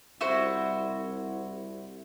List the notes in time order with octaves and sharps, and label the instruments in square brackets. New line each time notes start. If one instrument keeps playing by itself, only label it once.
[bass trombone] C2 [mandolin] E4 F#4 C5